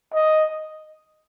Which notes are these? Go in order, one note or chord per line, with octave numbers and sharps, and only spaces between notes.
D#5